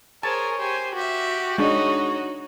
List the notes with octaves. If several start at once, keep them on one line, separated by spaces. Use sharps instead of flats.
G#4 A#4 C5 C#5 A5
G4 C5 G#5
F#4 G4 E5
G#3 D4 D#4 C#5 C#6